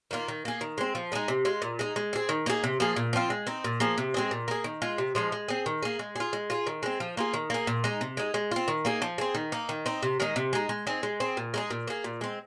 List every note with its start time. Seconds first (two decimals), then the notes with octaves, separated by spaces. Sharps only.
0.11 D#3 A#3 F4
0.28 D#3
0.45 A#3 G#4
0.61 D#3
0.78 G#3 C4
0.95 F3
1.12 G#3 D#4 G#4
1.28 C3
1.45 G#3 F4
1.62 A#2
1.79 G#3 D#4
1.96 G#3
2.13 C4 G#4
2.29 D#3
2.46 A#3 D#4 G#4
2.64 C3
2.80 F3 A#3 G#4
2.96 A#2
3.13 F3 C4 F4
3.30 G#3
3.47 C4 D#4
3.64 A#2
3.80 F3 A#3 G#4
3.98 C3
4.14 G#3 C4 G#4
4.31 A#2
4.48 A#3 G#4
4.64 D#3
4.82 G#3 F4
4.98 C3
5.15 F3 G#3 D#4
5.32 G#3
5.48 C4 G#4
5.66 D#3
5.82 A#3 G#4
5.99 G#3
6.16 F4 G#4
6.33 G#3
6.50 F4 G#4
6.67 D#3
6.83 G#3 C4
7.00 F3
7.17 A#3 F4 G#4
7.34 D#3
7.50 A#3 G#4
7.67 A#2
7.84 G#3 D#4
8.01 C3
8.17 G#3 D#4
8.34 G#3
8.51 C4 F4
8.68 D#3
8.85 A#3 D#4 G#4
9.02 F3
9.18 C4 G#4
9.35 D#3
9.52 A#3 D#4
9.69 D#3
9.86 C4 D#4
10.03 C3
10.20 D#3 G#3 D#4
10.36 C3
10.53 G#3 D#4
10.69 G#3
10.87 C4 D#4 G#4
11.03 G#3
11.20 C4 G#4
11.37 A#2
11.54 G#3 D#4 G#4
11.70 A#2
11.87 A#3 G#4
12.04 A#2
12.21 G#3 C4